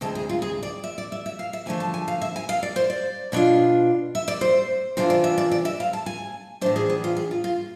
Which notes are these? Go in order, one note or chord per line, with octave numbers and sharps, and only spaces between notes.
D2 C3 G#3 A4
G#4
F4
G#4
D5
E5
D5
E5
E5
F5
E5
F2 D3 F3 A3 G#5
A5
G#5
F5
E5
G#5
F5
D5
C5
D5
B2 B3 D4 F4
E5
D5
C5
C3 E3 B3 D4 F4 C5
D5
E5
D5
D5
E5
F5
A5
G#5
A2 E3 B3 D4 C5
G#4
G#4
F4
G#4
F4
F4